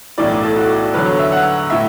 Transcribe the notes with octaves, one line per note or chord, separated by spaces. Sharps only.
B1 A2 E3 D5
A4
F#4
E2 D3 F#3 B4
C#5
E5
F#5
A2 E5